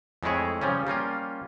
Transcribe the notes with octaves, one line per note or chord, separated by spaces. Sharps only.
F2 G#3 A3 E4 G#4 C#5
C#3 F3 G3 C#4
G3 A#3 C#4 F4